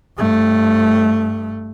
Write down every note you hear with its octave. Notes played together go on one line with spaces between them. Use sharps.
G2 A3